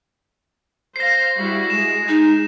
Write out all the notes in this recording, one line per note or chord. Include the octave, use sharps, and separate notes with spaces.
C5 F5 A#6 C7
G3 E4 F#4
G#3 E7
D#4